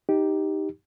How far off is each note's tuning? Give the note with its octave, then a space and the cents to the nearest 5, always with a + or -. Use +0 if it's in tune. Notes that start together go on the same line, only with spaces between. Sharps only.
D#4 +5 G4 +0